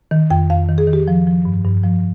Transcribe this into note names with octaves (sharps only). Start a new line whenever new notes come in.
D#3
F2 G5
F2 F5
D#3
G#4
D#3
G4
F3
F3
G2
G2
F3